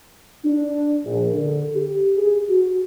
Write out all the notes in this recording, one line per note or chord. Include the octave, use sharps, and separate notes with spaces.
D4
A#1
D3
G4
G#4
F#4